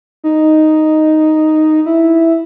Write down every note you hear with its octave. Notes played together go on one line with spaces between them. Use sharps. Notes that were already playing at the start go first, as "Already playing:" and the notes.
D#4
E4